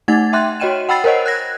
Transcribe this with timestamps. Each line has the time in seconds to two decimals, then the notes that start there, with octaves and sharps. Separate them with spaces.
0.08 A3 D#4 F#5 G#6 A6
0.33 E5 G5 C6 F#6
0.60 F#4 C#5 D#5 G5 D#7 E7
0.89 F#5 G5 B5 E6 A6 C7
1.04 A#4 C5 C#5 D#5 F#5
1.26 F#6 G#6 A#6